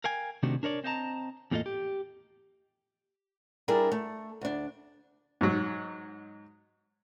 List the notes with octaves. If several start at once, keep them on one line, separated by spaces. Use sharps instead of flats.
A#4 F5 G5 G#5
C3 D#3 A3 C4 D4 F#4
D4 A#4 C#5 D5
C4 C5 D#5 F5 A5 A#5
E2 A2 A#3 F4 A4 D#5
G4
G3 D4 E4 G#4 A#4
A3
D2 D4
G#2 F#3